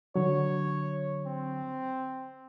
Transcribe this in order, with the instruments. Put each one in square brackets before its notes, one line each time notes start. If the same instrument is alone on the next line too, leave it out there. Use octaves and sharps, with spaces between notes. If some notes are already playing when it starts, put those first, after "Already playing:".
[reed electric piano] D3 F#3 [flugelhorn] C#5
[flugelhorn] C4